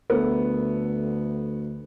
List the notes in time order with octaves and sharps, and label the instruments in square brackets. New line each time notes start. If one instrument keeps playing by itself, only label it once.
[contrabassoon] D2 [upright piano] A3 B3